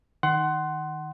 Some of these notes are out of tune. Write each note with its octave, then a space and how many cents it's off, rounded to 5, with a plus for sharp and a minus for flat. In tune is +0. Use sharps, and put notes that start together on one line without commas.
D#3 +0 F#5 +20 C6 +0